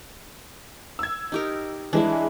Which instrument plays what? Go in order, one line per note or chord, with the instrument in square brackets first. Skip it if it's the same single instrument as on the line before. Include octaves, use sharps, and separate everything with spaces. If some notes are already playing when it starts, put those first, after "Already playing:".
[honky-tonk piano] E6 G#6
[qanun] D#4 G4 A#4
[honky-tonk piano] E3 G#3 [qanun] D4 E4